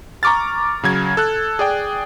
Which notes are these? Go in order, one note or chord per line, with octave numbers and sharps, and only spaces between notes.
A#5 C#6 D6 F6 A6
C#3 F#3 G#6
A4 F#6
G#4 D5 G5